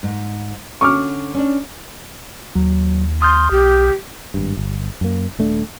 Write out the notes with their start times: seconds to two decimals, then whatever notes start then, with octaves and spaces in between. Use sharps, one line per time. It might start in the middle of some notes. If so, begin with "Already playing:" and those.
0.03 G#2
0.81 D3 C#4 C#6 D6 F6
1.34 C#4 D4
2.55 D#2 F#3
3.22 C6 D#6 F6 G6
3.51 B1 G4
4.34 G#1 G2
4.57 G1
5.01 F#2 A#3
5.39 D#1 A3 D4